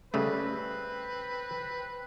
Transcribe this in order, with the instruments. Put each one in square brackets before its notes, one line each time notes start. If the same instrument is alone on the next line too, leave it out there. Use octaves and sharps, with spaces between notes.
[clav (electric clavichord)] C#3 G3 A3 [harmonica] C4 B4